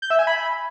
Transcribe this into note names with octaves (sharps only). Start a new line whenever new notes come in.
G6
E5
G#5
B5